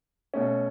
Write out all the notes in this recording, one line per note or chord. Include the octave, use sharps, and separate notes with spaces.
B2 A3 C#4